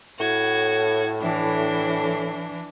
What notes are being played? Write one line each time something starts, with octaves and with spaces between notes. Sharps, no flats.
A2 F#4 G#6
E3 D4